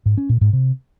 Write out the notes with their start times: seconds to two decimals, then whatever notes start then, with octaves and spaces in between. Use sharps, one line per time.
0.06 G#2
0.18 C#4
0.29 A#2
0.41 G#2
0.53 C3